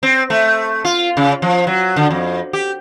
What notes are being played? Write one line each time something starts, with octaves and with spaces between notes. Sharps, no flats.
C4
A3
F4
C#3
F3
F#3
D3
F2
G4